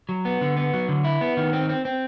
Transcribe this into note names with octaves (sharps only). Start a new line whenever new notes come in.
F#3
B3
D3
B3
F#3
D3
E4
B3
D#3
C4
C4
C4